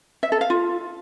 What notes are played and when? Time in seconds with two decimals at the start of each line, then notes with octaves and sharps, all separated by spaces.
0.23 E5
0.32 A4
0.41 F5
0.50 F4